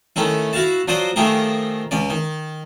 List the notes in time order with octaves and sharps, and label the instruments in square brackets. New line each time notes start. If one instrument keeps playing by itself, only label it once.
[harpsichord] D#3 A3 C#4 E4
E4 F#4 F5 A5
F3 F#3 F#4 C5 D5 D#6
D#3 F3 A3 G4 G#4 A#4
C#2 C#4 D5
D#3